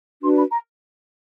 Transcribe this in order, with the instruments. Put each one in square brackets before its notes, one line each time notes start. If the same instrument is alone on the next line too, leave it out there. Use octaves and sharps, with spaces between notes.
[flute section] D4 F#4 B4 C6
B5
A#5